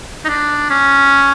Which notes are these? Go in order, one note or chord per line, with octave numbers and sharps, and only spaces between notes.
D#4
D4
C#4